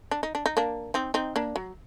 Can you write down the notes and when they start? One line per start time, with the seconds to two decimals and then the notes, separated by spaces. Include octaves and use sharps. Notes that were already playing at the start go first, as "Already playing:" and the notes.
0.11 D4
0.23 D#4
0.35 D4
0.46 D#4
0.57 A#3 D4
0.94 C4 D#4
1.14 C4 D#4
1.36 A#3 D4
1.56 F#3